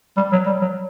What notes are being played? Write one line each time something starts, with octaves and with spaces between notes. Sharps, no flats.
G3
F#3
G3
F#3